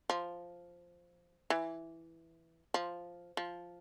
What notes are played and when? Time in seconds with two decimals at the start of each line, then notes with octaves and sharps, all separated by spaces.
0.10 F3
1.50 E3
2.74 F3
3.37 F3